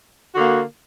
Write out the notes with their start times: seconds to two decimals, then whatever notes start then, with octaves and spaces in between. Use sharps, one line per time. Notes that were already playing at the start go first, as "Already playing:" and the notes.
0.34 F#4
0.37 D3
0.39 A#3